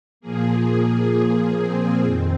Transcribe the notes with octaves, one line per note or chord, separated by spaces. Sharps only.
A#2 F3 A#3 G#4
G#4
C4
F2 D#3 C4